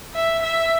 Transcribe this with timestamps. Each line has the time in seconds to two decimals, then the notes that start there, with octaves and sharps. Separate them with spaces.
0.15 E5
0.43 E5